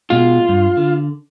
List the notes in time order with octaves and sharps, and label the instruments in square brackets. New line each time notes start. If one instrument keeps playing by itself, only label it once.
[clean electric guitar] B2 G#3 [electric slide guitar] F4
[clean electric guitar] G2
D3